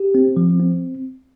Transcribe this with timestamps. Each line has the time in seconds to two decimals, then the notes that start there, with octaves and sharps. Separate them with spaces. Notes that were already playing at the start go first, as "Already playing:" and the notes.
Already playing: G4
0.15 C4
0.37 F3
0.60 C4